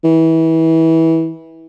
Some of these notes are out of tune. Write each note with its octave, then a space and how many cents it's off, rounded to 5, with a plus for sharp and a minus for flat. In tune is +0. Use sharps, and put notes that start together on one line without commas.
E3 -25